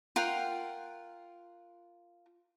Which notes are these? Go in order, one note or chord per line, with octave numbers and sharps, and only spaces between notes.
F4 A#4 F#5 G5